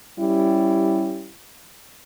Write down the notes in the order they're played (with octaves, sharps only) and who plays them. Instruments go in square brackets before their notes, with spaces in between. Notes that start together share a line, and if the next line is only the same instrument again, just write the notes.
[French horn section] G3 C#4 E4 G4